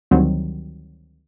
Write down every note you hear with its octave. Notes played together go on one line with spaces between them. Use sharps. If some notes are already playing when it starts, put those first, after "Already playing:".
D2 D#3 F#3 G3 C4